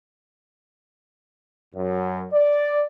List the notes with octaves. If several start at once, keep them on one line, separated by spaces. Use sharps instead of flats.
F#2
D5